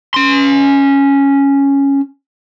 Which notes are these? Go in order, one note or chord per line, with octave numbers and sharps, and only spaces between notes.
C#4 C6